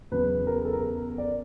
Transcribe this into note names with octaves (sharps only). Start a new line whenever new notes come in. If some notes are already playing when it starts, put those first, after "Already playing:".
E2 C#3 F#3 B3 B4
A#4
G#4
A4
A#4
D5